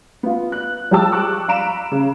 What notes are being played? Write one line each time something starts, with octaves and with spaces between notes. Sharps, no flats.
B3 F4
F#6
F3 G3 G#3 G5 A5 E6
C#6 D6 E6 F#6
F5 A#5 B5 D7 E7
C#3